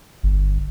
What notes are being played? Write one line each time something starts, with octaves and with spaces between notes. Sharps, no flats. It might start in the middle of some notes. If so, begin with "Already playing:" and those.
G1